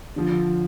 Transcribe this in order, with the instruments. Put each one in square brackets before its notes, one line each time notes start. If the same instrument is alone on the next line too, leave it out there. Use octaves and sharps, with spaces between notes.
[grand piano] D3 F3